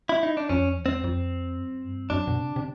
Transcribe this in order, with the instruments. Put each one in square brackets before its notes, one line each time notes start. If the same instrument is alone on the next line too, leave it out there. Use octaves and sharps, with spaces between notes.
[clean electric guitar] E4
D#4
D4
[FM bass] F2 [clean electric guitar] C#4
[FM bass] E2
[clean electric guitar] C4
[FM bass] F2
F#2
G2
[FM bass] F#2 [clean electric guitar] D4
[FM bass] B2
C3
C3